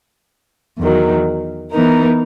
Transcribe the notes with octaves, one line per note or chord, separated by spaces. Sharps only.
E2 D#3 F#3
E3 B3 D#4 A#4